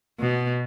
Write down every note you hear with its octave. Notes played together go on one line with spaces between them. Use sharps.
B2